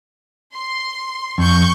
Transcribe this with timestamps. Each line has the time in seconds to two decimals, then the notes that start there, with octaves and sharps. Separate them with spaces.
0.51 C6
1.38 F2 C#6 G6